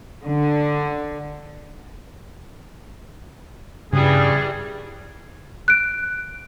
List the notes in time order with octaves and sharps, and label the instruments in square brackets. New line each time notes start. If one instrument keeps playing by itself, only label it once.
[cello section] D3
[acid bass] G2 [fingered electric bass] C#3 [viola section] E3 G3 [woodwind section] G#4
[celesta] F#6 D7